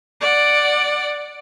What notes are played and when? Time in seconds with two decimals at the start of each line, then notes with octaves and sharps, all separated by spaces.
0.21 D5 F#5